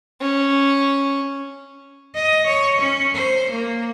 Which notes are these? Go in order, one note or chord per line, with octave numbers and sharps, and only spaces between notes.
C#4
D#5
C#5
C#4
C5
A#3